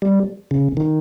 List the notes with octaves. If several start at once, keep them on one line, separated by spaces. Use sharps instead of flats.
G3
C#3
D#3